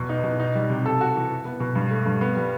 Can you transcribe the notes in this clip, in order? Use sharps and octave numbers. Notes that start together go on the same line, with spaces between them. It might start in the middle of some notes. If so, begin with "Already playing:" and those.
Already playing: E2 B2
D#4
B2
D#4
G3
C3
A4
F#4
E3
E4
B3
B2
G2
A3
G2
B3
G3